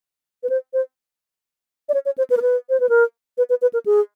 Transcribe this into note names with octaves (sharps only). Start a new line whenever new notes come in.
B4
C5
C5
D5
C#5
C#5
C5
B4
A#4
B4
C5
B4
A#4
B4
B4
B4
A#4
G#4